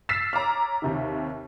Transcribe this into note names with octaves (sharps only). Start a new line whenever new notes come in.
E6 F6 A6 B6 C7 E7
C#5 A#5 D6 F6
D#2 C3 D#3